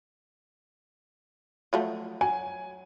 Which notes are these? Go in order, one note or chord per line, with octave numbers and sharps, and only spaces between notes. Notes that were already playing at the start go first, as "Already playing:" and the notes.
F3 F#3 A3
F#3 G#5